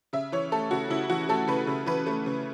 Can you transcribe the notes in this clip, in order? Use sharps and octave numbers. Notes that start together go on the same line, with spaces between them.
C#3 E5
E3 C#5
A3 A4
C#3 F#4
C#3 E4
E3 F#4
A3 A4
C#3 B4
C#3
E3 B4
A3
C#3